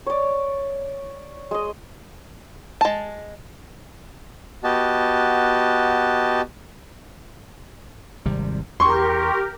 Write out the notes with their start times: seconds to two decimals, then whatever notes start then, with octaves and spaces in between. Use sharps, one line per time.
0.07 C#5 D5
1.51 G#3 D#5
2.81 G#3 A5
4.64 B3 F#4 G4 D#5 A5
8.26 G#1 C3 G3
8.80 E2 G4 A#4 C6 C#6